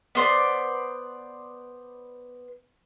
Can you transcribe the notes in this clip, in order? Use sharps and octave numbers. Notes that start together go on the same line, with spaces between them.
B3 C5 D5